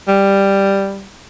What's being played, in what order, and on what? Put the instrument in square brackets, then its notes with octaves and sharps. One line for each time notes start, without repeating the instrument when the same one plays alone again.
[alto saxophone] G3